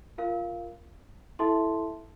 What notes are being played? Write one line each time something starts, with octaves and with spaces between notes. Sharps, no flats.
F4 A#4 F5
E4 A4 E5 A5 C6